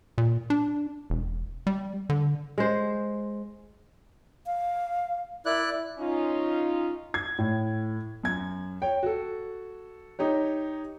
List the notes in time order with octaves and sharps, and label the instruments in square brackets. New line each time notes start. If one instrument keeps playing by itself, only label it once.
[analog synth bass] A#2
D4
E1
G3
D3
[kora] G#3 C5
[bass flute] F5
[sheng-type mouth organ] E4 D5 F#6 [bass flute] A#4
[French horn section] C#4 D#4 F4
[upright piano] G#6
A2
F#2 G#6
C#5 G5
F#4 A4
D#4 G4 C#5